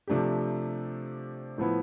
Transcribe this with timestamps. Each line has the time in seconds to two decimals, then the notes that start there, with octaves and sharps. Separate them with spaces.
0.08 C3 F3 A3 D4 G4
1.58 A2 F3 B3 E4